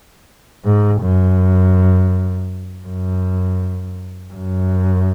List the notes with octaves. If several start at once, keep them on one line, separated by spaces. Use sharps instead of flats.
G#2
F#2
F#2
F#2